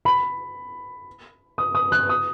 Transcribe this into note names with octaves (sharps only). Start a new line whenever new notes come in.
B5
D#6
D#6
F#6
D#6